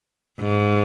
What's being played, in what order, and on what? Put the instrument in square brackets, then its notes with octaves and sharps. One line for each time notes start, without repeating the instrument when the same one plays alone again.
[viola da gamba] G#2